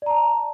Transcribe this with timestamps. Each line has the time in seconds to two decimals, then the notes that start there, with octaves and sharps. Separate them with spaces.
0.02 D5
0.06 A#5
0.11 A5